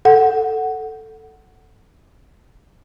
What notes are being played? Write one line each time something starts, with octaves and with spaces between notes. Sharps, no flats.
A4 F#5